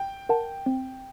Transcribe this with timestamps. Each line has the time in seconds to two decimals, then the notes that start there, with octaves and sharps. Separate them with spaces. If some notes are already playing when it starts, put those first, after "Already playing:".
Already playing: G5
0.29 A#4 F#5 A5
0.66 C4